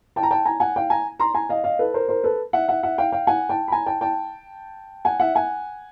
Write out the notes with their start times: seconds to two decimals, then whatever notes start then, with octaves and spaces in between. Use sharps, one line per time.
0.16 G5 A5
0.23 A#5
0.31 G5 A5
0.45 G#5 A#5
0.60 F#5 G#5
0.76 F5 G5
0.90 G#5 A#5
1.20 A#5 C6
1.34 G#5 A#5
1.49 D#5 F5
1.64 D#5 F5
1.79 A4 B4
1.94 A#4 C5
2.08 A#4 C5
2.24 A4 B4
2.53 E5 F#5
2.68 E5 F#5
2.83 E5 F#5
2.98 F5 G5
3.12 F5 G5
3.27 F#5 G#5
3.49 G5 A5
3.68 B5
3.72 G#5 A#5
3.86 G5 A5
4.01 G5 A5
5.05 F#5 G#5
5.20 E5 F#5
5.35 F#5 G#5